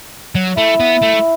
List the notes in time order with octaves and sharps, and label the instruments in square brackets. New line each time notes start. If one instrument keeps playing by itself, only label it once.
[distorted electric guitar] F#3
[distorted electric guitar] A3 [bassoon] E4
[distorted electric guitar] B3
A3